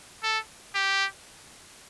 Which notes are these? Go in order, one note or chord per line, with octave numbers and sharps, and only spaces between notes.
A4
G4